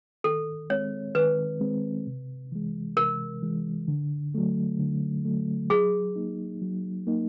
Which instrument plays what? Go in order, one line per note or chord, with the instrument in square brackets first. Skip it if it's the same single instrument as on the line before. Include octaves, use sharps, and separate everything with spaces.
[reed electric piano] D#3 [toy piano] A4
[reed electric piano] G#3 C4 [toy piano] C#5
[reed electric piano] D#3 [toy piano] B4
[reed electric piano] G#3 C4
C3
E3 G#3
[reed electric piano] C3 [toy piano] A#4
[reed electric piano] E3 G#3
D3
F#3 A3
D3
F#3 A3
[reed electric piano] F#3 [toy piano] G#4
[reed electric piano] A#3 D#4
F#3
A#3 D#4